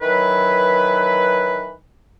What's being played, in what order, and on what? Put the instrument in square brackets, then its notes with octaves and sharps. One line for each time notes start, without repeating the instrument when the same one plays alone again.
[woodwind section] D#3 E3 F#3 B4